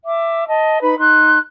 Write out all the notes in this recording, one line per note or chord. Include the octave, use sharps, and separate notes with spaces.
E5 D6
D#5 A5
D#4 B4 B5
D#4 C6 F#6